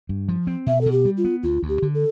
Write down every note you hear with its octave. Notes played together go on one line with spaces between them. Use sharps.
G2
F3
C4
B2 E5
B2 A4
G4
G3
F4
B3
D2 F4
D2
G4
D3
A4